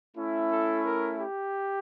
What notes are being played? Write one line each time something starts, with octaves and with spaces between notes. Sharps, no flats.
A3 C#4 E4
A4
A#4
G4